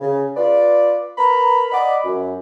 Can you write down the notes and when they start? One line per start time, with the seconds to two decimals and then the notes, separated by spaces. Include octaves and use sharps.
0.01 C#3
0.37 F4 B4 D5
1.18 A#4 B4 A#5 B5
1.72 D5 D#5 F#5 B5 D6
2.04 F#2